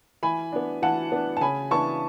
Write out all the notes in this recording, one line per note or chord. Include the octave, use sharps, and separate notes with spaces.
E3 G#5 B5
B3 D4
E3 F#5 A5
B3 D4
A5
C#3 G#5 B5
E3 B3 D4 A5 C#6